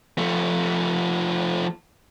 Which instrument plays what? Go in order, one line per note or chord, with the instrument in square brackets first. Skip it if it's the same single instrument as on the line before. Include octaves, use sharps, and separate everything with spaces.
[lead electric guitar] F3 A3